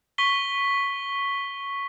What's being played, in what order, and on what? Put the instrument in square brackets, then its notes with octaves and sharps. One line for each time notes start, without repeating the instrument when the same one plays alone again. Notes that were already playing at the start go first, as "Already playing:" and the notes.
[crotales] C#6 B6 G7